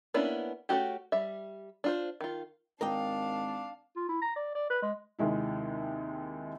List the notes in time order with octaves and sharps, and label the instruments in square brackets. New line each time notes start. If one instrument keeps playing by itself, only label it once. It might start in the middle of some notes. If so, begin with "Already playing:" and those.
[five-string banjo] A#3 B3 C#4 D4 E4
A3 C#4 F#4 G4
G3 E5
D4 F4 C5
D#3 F4
[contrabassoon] G#1 [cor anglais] D4 [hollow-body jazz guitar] A#4 D#5 G5 [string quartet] F5 A5
[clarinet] F4
E4
A#5
D5
D5
B4
G#3
[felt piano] D#2 C3 G#3 E4